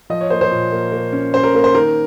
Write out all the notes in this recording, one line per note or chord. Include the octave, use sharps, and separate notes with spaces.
F3 D#5
C#5
A#3 C5
C5
A#2
A#3
A#3
C#4
C#4 C5
A#4
A#3
C5
D#3 A#4